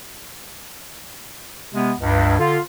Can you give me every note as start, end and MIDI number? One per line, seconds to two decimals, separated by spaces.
1.74 1.93 48
1.74 1.93 56
1.74 1.93 59
2.00 2.36 37
2.00 2.36 43
2.39 2.58 50
2.39 2.58 65